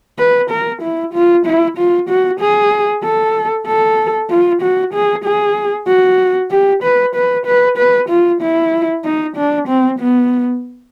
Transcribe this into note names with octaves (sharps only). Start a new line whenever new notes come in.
B4
A#4
E4
F4
E4
F4
F#4
G#4
A4
A4
F4
F#4
G#4
G#4
F#4
G4
B4
B4
B4
B4
F4
E4
D#4
D4
C4
B3